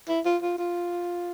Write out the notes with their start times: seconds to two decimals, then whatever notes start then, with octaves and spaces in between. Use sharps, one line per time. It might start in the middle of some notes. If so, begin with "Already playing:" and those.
0.09 E4
0.26 F4
0.42 F4
0.58 F4